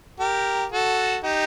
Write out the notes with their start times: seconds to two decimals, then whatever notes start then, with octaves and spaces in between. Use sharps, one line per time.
0.20 G4 A#4
0.72 F#4 A4
1.24 D#4 G4